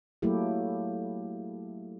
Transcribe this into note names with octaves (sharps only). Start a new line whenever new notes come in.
F#3 A3 A#3 E4 G4